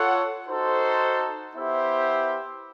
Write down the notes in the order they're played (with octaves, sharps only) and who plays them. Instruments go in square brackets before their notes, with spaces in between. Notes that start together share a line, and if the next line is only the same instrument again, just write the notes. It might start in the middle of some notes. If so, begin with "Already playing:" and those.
Already playing: [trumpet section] F4 A4 C#5 F#5
D#4 F#4 A4 C5
B3 E4 G4 C5 E5